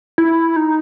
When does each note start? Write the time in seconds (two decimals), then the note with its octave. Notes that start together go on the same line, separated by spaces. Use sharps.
0.18 E4
0.56 D#4